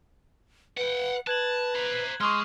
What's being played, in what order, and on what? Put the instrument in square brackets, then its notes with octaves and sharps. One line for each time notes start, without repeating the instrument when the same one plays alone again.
[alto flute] B4 [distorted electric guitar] F#5 G5
[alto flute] B4 [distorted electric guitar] A5 [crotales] F#6 G#6 F#7
[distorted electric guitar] C5 A#5
[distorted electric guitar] G#3 [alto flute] C6 [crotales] C#6 D#6 F6